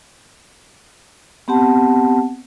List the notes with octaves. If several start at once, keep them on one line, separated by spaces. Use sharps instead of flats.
B3 C4 G4 F#5 A5